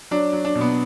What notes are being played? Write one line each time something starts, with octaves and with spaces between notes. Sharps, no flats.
F#3 D4
F#3
D4
B2
B3